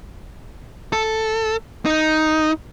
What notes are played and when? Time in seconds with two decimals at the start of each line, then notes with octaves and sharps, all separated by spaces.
0.93 A4
1.85 D#4